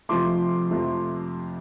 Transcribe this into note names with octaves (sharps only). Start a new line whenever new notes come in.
F2 C3 F3 A3 C6 D6
F2 C3 F3 A3